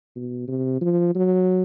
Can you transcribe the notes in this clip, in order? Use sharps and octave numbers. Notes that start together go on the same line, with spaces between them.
B2
C3
F3
F#3